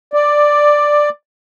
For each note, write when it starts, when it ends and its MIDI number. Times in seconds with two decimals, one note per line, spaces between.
0.13 1.09 74